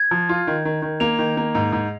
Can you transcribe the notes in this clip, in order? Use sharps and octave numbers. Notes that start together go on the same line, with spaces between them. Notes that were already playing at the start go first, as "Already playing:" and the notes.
Already playing: G#6
F3
F4
D#3
D#3
D#3
A#3 F7
D#3
A#3
G#2
G#2